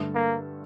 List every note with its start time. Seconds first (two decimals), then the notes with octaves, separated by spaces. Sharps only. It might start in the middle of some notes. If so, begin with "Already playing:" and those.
Already playing: G2 D3 A3 E4 A4
0.15 A#3